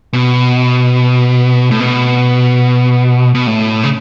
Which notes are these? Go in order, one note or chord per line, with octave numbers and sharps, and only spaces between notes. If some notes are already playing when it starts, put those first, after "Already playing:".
B2
A2
B2
B2
A2
C#3